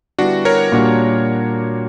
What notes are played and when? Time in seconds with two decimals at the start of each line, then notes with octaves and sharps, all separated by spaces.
0.18 D3 G3 B3 D4 E4 F#4 G4
0.45 A#4 C#5
0.72 A#2 G3 A#3 D4 F#4